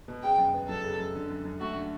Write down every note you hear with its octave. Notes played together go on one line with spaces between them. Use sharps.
B2
C#3 G5
F#2
B3
F#3 A4
C#3
F#2
D3
F#2
F#2
A3 F#4
D3